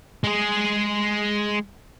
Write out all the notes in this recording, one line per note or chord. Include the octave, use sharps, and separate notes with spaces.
G#3 G#4